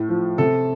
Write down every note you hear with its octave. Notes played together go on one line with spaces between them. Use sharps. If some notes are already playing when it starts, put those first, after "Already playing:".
Already playing: A2
F3
C3 A4